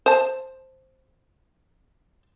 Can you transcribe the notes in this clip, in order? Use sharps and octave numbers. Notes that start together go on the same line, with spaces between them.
C5 A5